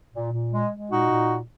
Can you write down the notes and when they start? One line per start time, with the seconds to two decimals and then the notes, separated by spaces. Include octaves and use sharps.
0.13 A#2
0.32 A#2
0.52 G#3
0.71 G#3
0.89 A#2 D#4 F#4
1.09 A#2